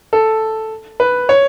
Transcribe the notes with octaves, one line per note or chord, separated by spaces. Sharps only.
A4
B4
C#5